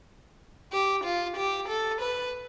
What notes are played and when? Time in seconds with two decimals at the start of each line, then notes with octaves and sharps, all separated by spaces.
0.73 G4
1.04 F4
1.37 G4
1.69 A4
2.01 B4